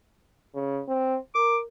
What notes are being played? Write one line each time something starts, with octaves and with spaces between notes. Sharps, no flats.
C#3
C4
A#4 D6